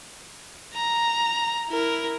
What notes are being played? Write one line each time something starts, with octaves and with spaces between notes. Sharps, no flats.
A#5
E4 A#4